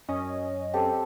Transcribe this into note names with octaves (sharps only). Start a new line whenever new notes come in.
F#2 C#4 D#5
C4 G4 A4